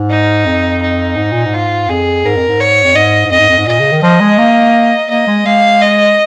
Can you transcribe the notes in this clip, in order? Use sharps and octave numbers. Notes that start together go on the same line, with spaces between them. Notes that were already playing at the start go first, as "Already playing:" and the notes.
Already playing: G#2
D#4
F2
D#4
G#2
A#2
G#2
F4
F2 G#4
G#2 A#4
F2
G#2
C#5
F2
G#2 D#5
G#2
F2 D#5
G#2
F2
G#2
A#2 D#5
C#3
D#3
F3 D#5
G#3
A#3
A#3 D#5
G#3
G#3 F5
D#5